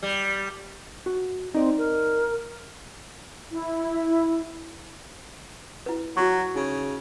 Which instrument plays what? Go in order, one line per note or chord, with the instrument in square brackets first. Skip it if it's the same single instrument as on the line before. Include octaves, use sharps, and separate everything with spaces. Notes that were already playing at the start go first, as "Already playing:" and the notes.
[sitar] G3
[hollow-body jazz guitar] F#4
[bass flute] C4 [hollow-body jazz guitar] D#4 D5
[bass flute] A#4
[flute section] E4
[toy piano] E4 B4
[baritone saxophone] F#3 [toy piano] F#4 C#6
[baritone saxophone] C#3 [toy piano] D#4